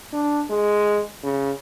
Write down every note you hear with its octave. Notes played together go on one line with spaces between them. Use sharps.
D4
G#3
C#3